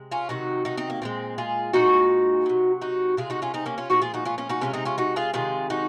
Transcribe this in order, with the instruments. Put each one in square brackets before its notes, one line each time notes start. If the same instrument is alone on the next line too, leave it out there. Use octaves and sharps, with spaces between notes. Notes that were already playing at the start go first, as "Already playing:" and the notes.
Already playing: [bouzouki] C3 G#3
C#4 F4
C3 D#3 F#3 D#4 F#4
D#4 F#4
C4 D#4
A#3
A#2 F3 G#3 C4
F4 G#4
A#2 G#3 D#4 F#4
C3 F#3
D#4 F#4
C3 F3 G#3 F4 G#4
D#4 F#4
C#4 F4
C4 D#4
A#3 C#4
C#4 F4
A#2 F3 G#3 D#4 F#4
F4 G#4
D#4 F#4
C#4 F4
C#4 F4
D#4 F#4
C3 F3 G#3 C#4 F4
C4 D#4
C#4 F4
D#4 F#4
F4 G#4
C3 D#3 G#3 F4 G#4
D#4 F#4